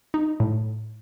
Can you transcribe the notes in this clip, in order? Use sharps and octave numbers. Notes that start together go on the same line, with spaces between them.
D#4
A2